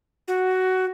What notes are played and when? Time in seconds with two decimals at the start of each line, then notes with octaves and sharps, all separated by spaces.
0.28 F#4